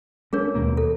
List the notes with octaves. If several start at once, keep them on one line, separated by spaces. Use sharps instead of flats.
G#3 C#4 D4 G#4 A#4 C#5
D#2 B2 A#3
A4